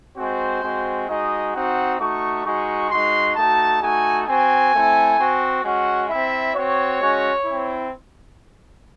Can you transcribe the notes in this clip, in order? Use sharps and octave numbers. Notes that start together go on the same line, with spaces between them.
G#3 C4 F#4 C5
G#3 C4 F#4
G#3 D#4 F#4 D#5
C4 D#4 F#4 F#5
A3 D#4 F#4 C#6
G#3 D#4 F#4 C#6
G#3 D#4 F#4 C6
A3 D#4 F#4 A5
A3 D#4 F#4 G#5
C4 F#4 G#5
A3 C4 E4
C4 F#4
G#3 C#4 F#4 F#5
C4 E4 E5
C4 F#4 C#5
G#3 C#4 F#4
C4 E4